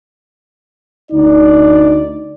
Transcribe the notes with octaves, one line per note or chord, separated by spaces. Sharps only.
D2 D#4 D5